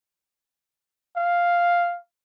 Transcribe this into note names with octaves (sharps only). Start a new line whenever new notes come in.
F5